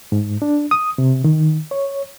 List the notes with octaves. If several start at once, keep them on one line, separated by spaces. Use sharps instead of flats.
G#2
D4
D#6
C3
D#3
C#5